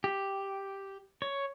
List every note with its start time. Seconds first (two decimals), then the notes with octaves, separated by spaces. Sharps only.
0.04 G4
1.22 C#5